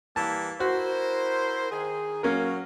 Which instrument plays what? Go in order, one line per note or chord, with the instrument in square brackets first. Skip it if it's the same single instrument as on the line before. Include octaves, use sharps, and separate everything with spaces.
[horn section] E3 G3 A#3 [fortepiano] A5
[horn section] E4 A#4 C5 [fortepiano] F#4
[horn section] D#3 G#4
[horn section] F#3 [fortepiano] A#3 C#4 A#4